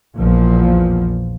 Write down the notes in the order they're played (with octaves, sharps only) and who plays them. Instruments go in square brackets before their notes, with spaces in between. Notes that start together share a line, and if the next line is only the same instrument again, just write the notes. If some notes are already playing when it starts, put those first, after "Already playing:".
[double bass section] A#1 E2 A#2 F3